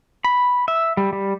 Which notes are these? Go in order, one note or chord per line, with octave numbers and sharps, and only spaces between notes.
B5
E5
G3
G3